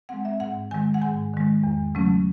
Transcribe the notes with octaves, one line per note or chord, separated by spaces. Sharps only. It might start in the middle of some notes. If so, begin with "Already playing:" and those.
G#3 C4 F#5
E5
G#2 F#5
D#3 G#3 G#5
F#5
G#2 G#5
D#3 G#3
E2
C#3 F#3 A3 C#4